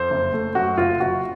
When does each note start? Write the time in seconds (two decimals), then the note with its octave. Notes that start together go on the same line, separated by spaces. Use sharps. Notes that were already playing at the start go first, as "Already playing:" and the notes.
Already playing: F2 C5
0.10 F#1
0.33 A3
0.55 F#2 F#4
0.78 F#1 F4
1.00 F#1 F#4